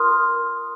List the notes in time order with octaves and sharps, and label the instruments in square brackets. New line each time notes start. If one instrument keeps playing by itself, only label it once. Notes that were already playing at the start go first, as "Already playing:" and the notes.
Already playing: [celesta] F4 A#4 C6 D#6 F6